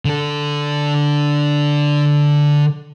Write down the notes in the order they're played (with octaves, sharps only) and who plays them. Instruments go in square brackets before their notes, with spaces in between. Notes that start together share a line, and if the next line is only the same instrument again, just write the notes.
[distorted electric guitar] D3 A4